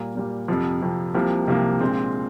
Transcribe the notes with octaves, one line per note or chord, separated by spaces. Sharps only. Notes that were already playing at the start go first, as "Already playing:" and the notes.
Already playing: A#2 G3 A#3
A#2 G3 A#3
F2 C3 F3
F2 C3 F3
C2 C3 F3 A#3
C2 C3 F3 A#3
A#1 A#2 G#3 C4